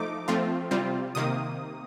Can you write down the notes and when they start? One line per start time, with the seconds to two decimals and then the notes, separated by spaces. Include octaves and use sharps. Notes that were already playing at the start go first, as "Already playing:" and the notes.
Already playing: F3 A3 D#4 D6
0.28 F3 A3 C4 F4
0.71 C3 G3 C4 F4
1.15 C3 D#3 A#3 D#6